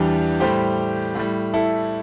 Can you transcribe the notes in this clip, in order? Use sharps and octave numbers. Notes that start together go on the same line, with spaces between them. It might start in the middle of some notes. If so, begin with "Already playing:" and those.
Already playing: E2 E3 G3 D4 G4
A2 G3 G4 C5
A2 G3
E4 A4